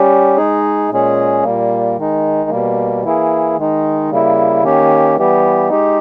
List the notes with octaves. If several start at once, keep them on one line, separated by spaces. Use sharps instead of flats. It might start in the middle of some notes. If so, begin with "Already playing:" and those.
Already playing: G3 C#4 G4
G#3 D#4 G#4
A#2 G#3 C#4 G#4
A#2 G3 A#3
D#3 G#3 D#4
B2 G3 A#3
E3 A#3 E4 G#4
D#3 G#3 D#4
C#3 G3 A#3 E4
D#3 A#3 C#4 G4
E3 G3 B3 G4
G#3 D#4 G4